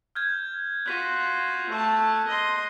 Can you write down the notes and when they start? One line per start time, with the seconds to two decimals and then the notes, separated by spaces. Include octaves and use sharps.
0.15 F6 G6 G#6
0.86 F4 F#4 F#6 B6 D#7
1.69 A3 A5
2.27 D#5 C6